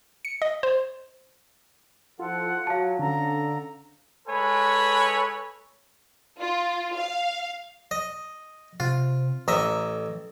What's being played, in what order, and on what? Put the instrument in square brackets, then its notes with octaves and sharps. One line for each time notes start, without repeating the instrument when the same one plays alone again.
[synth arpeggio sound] C#7
D#5
C5
[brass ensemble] F3 E4 A4 [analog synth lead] F4 [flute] F#5
[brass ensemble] F#3 [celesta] F5 A5
[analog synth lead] D3 [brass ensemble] C#4 A4 [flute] A#5
[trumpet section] G#3 A4 B4 C#5 G#5 B5
[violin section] F4
F5
[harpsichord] D#5
[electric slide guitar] C3 [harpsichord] F4
[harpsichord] A1 D#5 E5 [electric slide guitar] A4 A#5